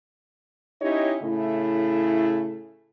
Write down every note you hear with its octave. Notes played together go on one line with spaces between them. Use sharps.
C#4 D#4 E4 G4 C#5 D#5
A2 C#3 A3 E4